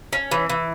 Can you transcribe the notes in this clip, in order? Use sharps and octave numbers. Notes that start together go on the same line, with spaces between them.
C#4
E3
E3